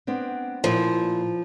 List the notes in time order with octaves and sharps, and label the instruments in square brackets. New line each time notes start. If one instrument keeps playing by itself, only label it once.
[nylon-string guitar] B3 C4 D4
[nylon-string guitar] A#2 E4 [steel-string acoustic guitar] F3